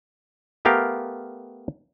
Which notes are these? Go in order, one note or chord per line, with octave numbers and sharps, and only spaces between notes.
A3 B3 G4 A#4 F5